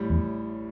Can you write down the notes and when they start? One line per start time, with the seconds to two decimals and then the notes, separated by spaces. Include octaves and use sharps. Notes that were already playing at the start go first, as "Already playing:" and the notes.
Already playing: A1 A2 G3
0.10 E2